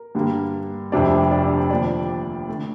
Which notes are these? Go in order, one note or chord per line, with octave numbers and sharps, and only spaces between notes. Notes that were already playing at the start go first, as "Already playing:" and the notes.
Already playing: A#4
G2 D3 G3 A#3
F1 F2 C3 D4 D5
D4 D5
D#2 D3 F3 D4 D5
D3 A3